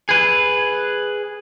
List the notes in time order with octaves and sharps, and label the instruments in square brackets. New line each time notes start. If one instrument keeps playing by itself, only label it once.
[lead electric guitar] G#4 B4